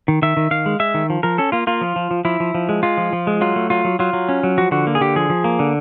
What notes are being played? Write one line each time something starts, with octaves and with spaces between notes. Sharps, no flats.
D#3
D#3 E5
D#3
D#3 F5
G#3
G#3 E5
D#3
F3
F3 A#4
C#4 A4
A#3 F4
A#3 F4
F3
F3
F3
F3 E4
F3
F3
G#3
G#3 F4
F3
F3
G#3
F#3 F4
A3
F#3 F4
F#3
F#3 F4
F#3
C#4
F#3
F3 F#4
D3 F#4
A#3
G#4
D3 G4
F3 G#4
F3
A#3
D3